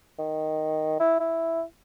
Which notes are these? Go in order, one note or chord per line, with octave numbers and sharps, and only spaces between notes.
D#3
E4
E4